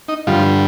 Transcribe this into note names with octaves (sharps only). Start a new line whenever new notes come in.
D#4 D#5
G2 D3 F3 G3 F4